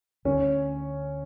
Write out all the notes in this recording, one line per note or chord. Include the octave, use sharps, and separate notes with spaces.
D2 D3 G3 C#4